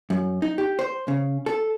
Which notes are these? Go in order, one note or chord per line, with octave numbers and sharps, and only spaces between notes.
F#2
D#4
G4
C5
C#3
A4